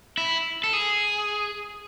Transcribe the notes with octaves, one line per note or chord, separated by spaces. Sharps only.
E4
A4
G#4